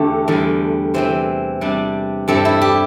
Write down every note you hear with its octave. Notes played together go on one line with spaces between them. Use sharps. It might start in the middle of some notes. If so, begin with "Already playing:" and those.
Already playing: E2 D3 A3 G4
E2 D3 G3
C3 E3 C4 C5
C3 G3 D4
G2 G3 C4 E4 A4
E4
G4